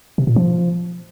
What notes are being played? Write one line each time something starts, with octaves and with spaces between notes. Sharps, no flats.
C3
A#2
F3